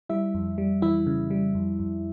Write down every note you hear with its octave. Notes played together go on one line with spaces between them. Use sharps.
G3 E4 E5
F2
G3
E3 E4 E5
C#3
G3
F2
F2